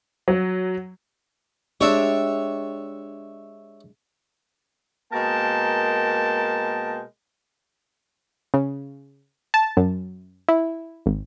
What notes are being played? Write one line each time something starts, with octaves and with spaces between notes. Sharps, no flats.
F#3
G#3 D4 G4 C#5 E5
B2 G#3 A#3 A#4 G5 A5
C#3
A5
F#2
E4
G#1